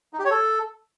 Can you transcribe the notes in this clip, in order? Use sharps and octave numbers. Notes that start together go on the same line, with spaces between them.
D#4
G4
C#5
A4